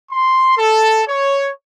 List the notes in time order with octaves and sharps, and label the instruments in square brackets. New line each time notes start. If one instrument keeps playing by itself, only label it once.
[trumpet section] C6
A4
C#5